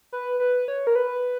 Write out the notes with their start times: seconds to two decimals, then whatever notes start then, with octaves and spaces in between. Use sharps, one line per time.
0.12 B4
0.40 B4
0.68 C#5
0.87 A#4
0.95 B4